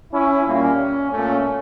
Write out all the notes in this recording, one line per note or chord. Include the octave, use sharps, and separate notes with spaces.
C#4 E4
A#2 G3 A#3 C#4
A#2 A3 C#4